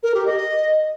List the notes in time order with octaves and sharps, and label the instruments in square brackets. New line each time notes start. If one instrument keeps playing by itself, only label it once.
[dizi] A#4
G4
D#5